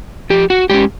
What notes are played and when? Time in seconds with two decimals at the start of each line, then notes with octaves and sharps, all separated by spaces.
0.30 F3 G4
0.50 F#4
0.70 G#3 C#4 G4